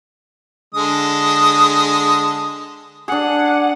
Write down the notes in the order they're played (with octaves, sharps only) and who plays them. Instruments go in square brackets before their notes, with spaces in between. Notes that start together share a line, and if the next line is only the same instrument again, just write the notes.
[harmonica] D3 G#3 D#6
[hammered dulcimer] D4 G#4 [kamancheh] F#5